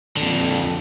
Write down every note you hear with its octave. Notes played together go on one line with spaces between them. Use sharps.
F2 D3